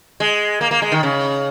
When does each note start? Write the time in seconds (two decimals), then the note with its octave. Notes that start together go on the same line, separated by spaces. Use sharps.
0.20 G#3
0.61 A#3
0.71 A#3
0.82 G#3
0.92 D#3
1.03 C#3